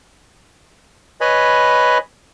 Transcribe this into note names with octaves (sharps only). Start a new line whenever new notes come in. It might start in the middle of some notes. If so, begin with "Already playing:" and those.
B4 C#5 D#5 G#5 B5